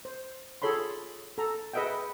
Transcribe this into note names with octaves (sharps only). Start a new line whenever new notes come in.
C5
F4 G#4 A4 C#5 B5 C6
A4 A#5
G#4 B4 D#5 E5 F#5 G5